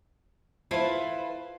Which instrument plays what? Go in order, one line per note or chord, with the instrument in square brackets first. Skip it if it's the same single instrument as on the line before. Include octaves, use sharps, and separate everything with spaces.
[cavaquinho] E4 F4 A4 [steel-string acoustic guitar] B4 C5